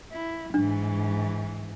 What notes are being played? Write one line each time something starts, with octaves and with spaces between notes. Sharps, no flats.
E4
G#2 E3 D4